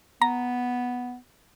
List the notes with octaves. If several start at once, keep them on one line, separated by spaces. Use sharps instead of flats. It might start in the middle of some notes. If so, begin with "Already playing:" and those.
B3 A#5